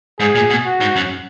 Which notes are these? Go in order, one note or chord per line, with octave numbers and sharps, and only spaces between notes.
G#2 G#4
A#2
B2
F#4
G#2
F#2